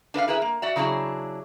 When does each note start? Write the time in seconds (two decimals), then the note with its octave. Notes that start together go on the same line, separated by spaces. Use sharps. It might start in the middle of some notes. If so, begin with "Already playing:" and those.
0.14 D4 B4 E5 F5
0.28 E4 G#4 A#4 B4 E5
0.42 A#3
0.62 F#4 D5 E5
0.76 C#3 F#3 D4 E4 G#4